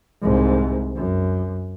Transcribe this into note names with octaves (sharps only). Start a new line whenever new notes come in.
C2 G#2
F#2